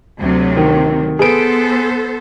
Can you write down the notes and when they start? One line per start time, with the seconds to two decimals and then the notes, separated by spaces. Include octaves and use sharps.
0.19 D2 C3 F#3
0.57 D#3
1.19 B3 G#4 A4 B4 C5 D7